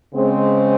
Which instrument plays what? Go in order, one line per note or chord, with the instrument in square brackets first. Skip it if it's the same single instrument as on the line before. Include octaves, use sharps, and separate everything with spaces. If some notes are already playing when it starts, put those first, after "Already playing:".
[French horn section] C#3 G#3 C4